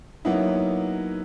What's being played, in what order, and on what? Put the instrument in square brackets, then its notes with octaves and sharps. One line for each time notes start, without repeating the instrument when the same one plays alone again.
[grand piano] F#3 A#3 B3 C#4 D#4 E4